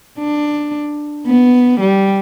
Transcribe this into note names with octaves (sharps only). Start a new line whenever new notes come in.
D4
B3
G3